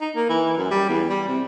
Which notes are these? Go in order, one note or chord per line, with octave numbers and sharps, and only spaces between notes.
D#4
A#3
E3
F#2
G3
E2
G3
C3